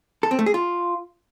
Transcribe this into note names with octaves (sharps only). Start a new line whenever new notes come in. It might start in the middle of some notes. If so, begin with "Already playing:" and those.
A4
C4
A3
G#4
F4